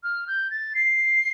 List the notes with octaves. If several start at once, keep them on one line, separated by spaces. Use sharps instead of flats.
F6
G6
A6
C7